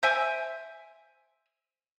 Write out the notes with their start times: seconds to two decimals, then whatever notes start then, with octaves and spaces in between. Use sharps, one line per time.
0.03 C5 E5 G5 G#5